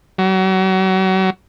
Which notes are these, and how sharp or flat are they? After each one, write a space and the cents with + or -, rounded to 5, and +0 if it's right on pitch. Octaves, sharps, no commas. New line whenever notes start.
F#3 +35